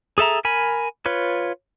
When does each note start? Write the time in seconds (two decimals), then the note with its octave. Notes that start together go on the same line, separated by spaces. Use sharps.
0.18 G#4 A4 E5 A#5
0.45 A#4 G#5 B5
1.05 F4 B4 C#5